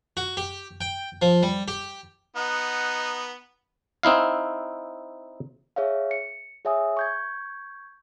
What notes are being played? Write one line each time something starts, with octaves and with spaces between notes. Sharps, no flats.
F#4
G4
G5
F3
G3
G4
B3 D#4 F#5
C4 D#4 E4 F5
G#4 C#5 E5 F5
C#7
G#4 C#5 E5 G#5 D#6
C#6 G6 G#6